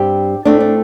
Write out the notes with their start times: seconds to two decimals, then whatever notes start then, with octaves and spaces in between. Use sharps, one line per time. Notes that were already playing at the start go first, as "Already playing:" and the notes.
Already playing: G2 G3 C4 G4
0.45 A2 A3 C4 D4
0.60 D4